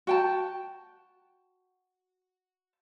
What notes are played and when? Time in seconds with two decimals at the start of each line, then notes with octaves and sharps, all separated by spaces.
0.07 F#4 G5 A5